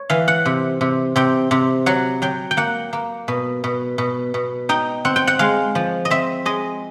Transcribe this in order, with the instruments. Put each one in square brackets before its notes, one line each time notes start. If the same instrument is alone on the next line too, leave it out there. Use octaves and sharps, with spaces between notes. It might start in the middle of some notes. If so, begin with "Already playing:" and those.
Already playing: [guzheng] C#5
E3 F5
F#5
C3
C3
C3 G5
C3
F#3 F#5
F#3 G5
G5
A#3 F#5
A#3
B2
B2
B2
B2
D#4 G5
C4 F#5
G5
F#5
G#3 F5
F3
D#5
C4 E5
G#3 D#5